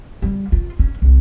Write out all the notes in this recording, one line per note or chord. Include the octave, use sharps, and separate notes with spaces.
G3
F4
C#4
C2